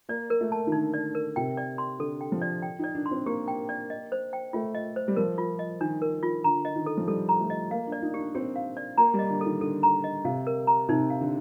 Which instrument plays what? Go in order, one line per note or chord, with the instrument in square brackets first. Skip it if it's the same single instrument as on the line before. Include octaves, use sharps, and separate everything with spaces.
[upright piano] A#3 [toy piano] D5
[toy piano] A#4
[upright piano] A3
[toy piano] A5
[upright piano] D#3
[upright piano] D3 [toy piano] D#4
[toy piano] D5
A#4
[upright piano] C3 [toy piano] G5
[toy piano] D5
C6
[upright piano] D3 [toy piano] A4
[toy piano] G5
[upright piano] F3
[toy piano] D5
G5
[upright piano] D#4 [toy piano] D5
[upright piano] D4
[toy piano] C6
[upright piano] C4
[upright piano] A#3 [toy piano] G4
[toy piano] G5
D5
D#5
C5
G5
[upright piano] A3 [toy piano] F4
[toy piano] D#5
C5
[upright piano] G3
[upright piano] F3 [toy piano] A#4
[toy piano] F4
D#5
[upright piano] D#3 [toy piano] D4
[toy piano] A#4
F4
[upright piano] D3 [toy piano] A#5
[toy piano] D#5
[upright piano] D#3
[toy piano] A4
[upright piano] F3
[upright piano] G3 [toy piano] A4
[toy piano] A#5
[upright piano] A3
[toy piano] D#5
[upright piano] A#3 [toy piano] F5
[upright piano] D4
[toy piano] D5
[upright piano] D#4
[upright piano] D4 [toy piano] G4
[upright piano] C4 [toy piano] G4
[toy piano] F5
D5
[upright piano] A#3 [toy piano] A#5
[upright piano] G3
[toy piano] D#5
[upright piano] D3
[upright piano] D#3 [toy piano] A4
[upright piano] D3 [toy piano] A4
[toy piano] A#5
D#5
[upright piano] C3 [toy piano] F5
[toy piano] A#4
A#5
[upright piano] C3 [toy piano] D#4
[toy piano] F5
[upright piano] D3